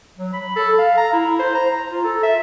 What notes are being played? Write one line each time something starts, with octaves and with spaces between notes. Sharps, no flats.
F#3
B5
A4
F5
A#5
E4
C5
A#5
F4
A4
E5